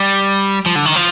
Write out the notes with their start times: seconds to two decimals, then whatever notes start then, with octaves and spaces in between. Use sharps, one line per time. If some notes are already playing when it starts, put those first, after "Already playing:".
Already playing: G3
0.66 F3
0.76 D3
0.86 D#3
0.96 F3